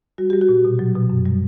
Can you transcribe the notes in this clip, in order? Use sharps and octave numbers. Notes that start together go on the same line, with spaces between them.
G3 F#4
G3 G4
F#4
A#2
B2
F#3
B2
F#2
G3